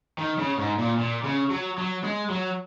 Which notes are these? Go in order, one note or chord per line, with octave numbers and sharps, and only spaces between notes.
D#3
C#3
G#2
A#2
A#2
C#3
F#3
F#3
G#3
F#3